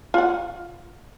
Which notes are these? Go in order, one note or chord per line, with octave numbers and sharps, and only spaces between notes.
F4 F#5